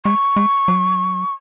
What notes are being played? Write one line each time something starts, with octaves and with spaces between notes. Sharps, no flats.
G#3 C#6
G#3
F#3